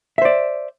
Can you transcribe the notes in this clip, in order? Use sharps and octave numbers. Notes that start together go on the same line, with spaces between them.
C5 D5 E5